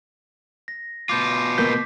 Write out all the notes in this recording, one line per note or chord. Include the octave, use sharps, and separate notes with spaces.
A#6
B2 F4 D6 G6
A#3 B3 G6 B6